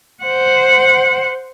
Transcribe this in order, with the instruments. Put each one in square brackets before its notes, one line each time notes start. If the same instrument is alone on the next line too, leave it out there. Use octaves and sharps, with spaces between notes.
[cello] C5 F#5